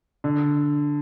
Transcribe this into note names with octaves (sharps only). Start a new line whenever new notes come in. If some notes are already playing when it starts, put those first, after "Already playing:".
D3